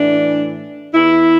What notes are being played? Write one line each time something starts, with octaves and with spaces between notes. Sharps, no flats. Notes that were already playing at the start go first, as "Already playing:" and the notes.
Already playing: A2 E3 D4
E2 E3 E4